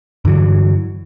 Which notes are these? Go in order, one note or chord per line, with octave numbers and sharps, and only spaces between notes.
G2 D3 E3 F#3